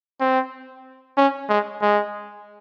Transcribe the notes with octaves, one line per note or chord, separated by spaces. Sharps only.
C4
C#4
G#3
G#3